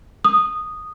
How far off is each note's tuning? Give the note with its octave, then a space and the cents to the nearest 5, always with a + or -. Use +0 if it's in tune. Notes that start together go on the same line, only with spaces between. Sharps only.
D#6 -10